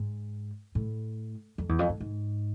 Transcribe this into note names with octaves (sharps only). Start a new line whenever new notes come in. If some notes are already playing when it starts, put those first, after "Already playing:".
Already playing: G#2
A2
F2
E2
F2
G#2
G#2